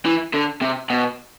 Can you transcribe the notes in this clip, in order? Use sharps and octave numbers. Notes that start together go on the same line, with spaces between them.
E3
D3
C3
B2